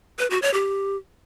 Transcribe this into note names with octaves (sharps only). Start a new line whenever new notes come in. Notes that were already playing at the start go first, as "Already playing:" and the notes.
B4
F#4
C#5
G4